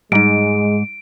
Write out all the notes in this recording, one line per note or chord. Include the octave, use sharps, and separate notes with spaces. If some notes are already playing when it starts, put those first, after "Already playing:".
G#2 G3 G#3 D#4 D7